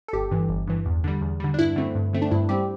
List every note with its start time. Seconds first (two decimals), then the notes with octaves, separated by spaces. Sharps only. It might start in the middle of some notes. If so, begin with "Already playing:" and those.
0.08 A4
0.13 G1 G4
0.31 G2 E3
0.49 G1
0.68 G2 E3
0.86 E2
1.04 D3 G3
1.21 E2
1.40 D3 G3
1.54 D4
1.59 G2 E4
1.76 D3 A3 C4
1.95 G2
2.13 D3 A3 C4
2.22 D4
2.31 G2 E4
2.49 G3 C4 G4